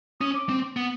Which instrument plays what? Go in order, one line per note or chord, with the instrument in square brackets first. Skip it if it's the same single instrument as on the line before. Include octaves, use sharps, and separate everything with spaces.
[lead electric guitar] C#4 [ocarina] D#6
[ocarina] D6
[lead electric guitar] C4
B3